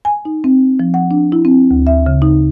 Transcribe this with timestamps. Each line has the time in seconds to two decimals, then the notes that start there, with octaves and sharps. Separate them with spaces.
0.05 G#5
0.25 D#4
0.44 C4
0.80 F3
0.94 F#5
1.11 D4
1.32 E4
1.45 C4
1.71 D2
1.87 E5
2.06 C#3
2.22 D#4